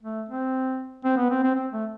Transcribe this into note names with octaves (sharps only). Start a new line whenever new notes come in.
A3
C4
C4
B3
C4
C4
C4
A3